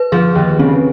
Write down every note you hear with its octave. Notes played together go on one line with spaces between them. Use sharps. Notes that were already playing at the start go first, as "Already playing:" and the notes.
Already playing: B4
F3 G#4
D#2
C#3 C4